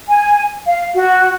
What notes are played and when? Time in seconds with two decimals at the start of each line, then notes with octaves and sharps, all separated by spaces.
0.08 G#5
0.66 F5
0.94 F#4